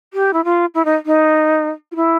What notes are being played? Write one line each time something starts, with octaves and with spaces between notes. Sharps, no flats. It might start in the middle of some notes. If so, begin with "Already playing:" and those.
G4
E4
F4
E4
D#4
D#4
F4
E4